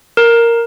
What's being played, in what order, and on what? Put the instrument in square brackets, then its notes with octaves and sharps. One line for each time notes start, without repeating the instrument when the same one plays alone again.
[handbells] A#4